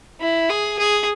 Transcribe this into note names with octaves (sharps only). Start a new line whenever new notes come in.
E4
G#4
G#4